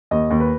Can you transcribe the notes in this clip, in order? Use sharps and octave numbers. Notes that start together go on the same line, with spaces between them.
D#2 D#5
D#2
B4